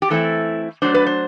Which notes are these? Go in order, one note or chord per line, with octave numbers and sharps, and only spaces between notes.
G4
E3 A3 C4 E4 A4
F#3 A3 D4 C5
B4
C5